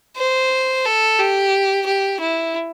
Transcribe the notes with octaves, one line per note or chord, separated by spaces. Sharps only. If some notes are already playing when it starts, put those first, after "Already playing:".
C5
A4
G4
G4
E4